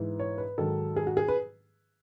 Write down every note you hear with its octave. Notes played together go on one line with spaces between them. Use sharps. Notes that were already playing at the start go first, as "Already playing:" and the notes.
Already playing: G#2 E3
C#5
B4
G#2 D#3 F#3 A4
G#4
F#4
G#4
B4